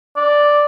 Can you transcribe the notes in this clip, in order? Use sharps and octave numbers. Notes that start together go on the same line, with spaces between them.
D5